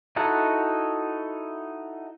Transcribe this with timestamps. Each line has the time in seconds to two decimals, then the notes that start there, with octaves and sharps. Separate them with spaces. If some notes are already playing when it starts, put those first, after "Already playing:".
0.16 D#4 E4 F#4 A4 F#5